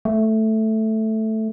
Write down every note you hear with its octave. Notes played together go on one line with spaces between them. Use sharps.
A3